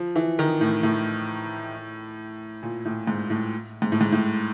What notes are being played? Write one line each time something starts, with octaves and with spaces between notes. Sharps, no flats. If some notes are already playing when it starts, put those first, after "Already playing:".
Already playing: F3
E3
D#3
A2
A2
A#2
A2
G#2
A2
G#2
A2
G#2
A2